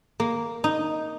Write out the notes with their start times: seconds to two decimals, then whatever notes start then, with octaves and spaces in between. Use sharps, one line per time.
0.20 A#3
0.64 D#4